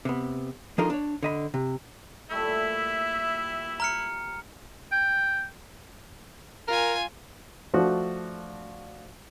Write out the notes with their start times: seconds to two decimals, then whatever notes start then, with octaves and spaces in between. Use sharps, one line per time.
0.05 C3 B3
0.78 F3 D4 D#4 F4 A4 A#4
0.90 D4 C#5
1.23 D3 D#5 B5
1.54 C3
2.31 A#2 G3 A3 E4 E5
3.80 A#5 F6 C#7
4.92 G5
6.68 F4 A#4 G#5
7.74 F3 A3 D4 F#4